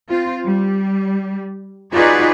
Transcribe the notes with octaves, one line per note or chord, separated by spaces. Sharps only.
C4 F4
G3
D#4 F4 F#4 G#4 B4 D5